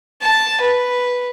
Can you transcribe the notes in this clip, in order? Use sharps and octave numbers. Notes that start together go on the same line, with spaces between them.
A5
B4